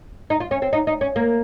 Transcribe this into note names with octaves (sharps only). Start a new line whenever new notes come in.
D#4
F4
C#4
C4
D#4
D#4
C#4
A#3